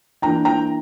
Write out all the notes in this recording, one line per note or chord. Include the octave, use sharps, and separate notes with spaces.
E3 A#3 D4 G5 A#5
G5 A#5